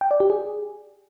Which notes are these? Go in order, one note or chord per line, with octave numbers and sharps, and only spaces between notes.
G5
D5
G4
G#4